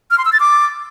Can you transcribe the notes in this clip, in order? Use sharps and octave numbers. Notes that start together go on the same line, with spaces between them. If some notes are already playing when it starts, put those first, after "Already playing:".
F6
C6
E6
A6
D6